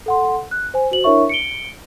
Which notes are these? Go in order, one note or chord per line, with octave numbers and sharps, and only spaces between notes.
A4 F#5 C6
F#6
C5 G#5
F#4 C5 F#7
D4 E4 A#4 C#5 E5 C#6
C#7 D7 G7